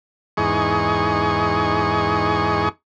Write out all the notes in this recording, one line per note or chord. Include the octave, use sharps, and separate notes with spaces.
E2 G#2 D#4 G#4 C#6